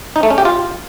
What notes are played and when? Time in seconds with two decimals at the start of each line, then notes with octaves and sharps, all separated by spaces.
0.16 D#4
0.23 A3
0.30 C#4
0.38 G4
0.45 F4